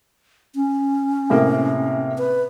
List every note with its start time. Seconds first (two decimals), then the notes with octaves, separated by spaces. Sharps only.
0.55 C#4
1.30 A2 C3 A#3
2.18 B4